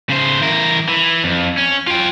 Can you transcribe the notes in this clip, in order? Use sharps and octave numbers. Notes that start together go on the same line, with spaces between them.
C#3 C5
E3 A#4
E3
F2
C#4
F4 G5